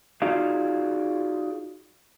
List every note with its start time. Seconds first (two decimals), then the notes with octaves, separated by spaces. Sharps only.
0.22 D#4 F4 F#4 G#4 D5 F5